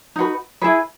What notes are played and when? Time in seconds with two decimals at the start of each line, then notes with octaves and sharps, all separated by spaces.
0.16 D#4 F#4 B4
0.62 E4 G#4 B4